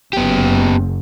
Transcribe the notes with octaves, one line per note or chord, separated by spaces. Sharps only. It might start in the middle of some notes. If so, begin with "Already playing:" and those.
F#1 B3 G4